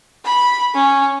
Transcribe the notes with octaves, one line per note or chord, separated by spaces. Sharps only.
B5
C#4